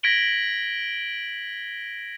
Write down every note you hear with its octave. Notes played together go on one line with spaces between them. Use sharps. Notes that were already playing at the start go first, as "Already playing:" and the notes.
G#6 A#6 B6 D7 F#7 G7